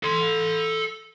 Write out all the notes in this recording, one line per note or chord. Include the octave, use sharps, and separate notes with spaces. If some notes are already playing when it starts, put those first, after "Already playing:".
A4 C6